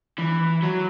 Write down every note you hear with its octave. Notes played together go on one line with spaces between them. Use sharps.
E3
F#3